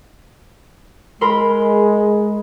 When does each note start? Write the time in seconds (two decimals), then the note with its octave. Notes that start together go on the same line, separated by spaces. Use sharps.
1.21 G#3 A#4 B5 C6